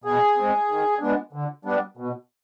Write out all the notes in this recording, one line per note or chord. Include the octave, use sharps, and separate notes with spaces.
B2 G#4
G#3 C4
D#3
G#3 B3 D4
D3
G3 B3 D4
B2